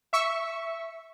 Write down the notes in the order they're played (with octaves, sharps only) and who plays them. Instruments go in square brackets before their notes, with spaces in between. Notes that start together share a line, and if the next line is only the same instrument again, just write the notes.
[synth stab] E5 C#6